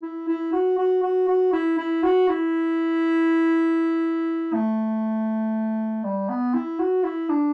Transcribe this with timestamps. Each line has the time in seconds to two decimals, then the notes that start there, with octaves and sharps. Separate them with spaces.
0.03 E4
0.28 E4
0.53 F#4
0.78 F#4
1.03 F#4
1.28 F#4
1.53 E4
1.78 E4
2.03 F#4
2.29 E4
4.54 A3
6.04 G3
6.29 B3
6.54 E4
6.79 F#4
7.04 E4
7.29 D4